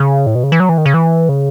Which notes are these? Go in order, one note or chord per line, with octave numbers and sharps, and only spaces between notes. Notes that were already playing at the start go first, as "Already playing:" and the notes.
Already playing: C#3
A2
B2
C#3
E3
F#3
E3
D#3
C#3
E3
C#3